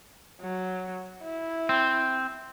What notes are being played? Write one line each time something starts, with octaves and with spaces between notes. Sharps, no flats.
F#3
E4
C4